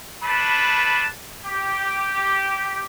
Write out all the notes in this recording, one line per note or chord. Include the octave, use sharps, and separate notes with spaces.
A3 D4 B4 A5 B5
G4